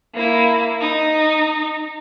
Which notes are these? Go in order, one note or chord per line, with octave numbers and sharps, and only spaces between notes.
A#3 E4
D#4